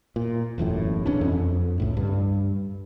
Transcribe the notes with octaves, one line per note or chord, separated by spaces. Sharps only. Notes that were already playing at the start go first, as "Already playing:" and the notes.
A#2
E1 A1 F#2 A2
D#1 E2 C#4 D4
F2
C#2 A2
G2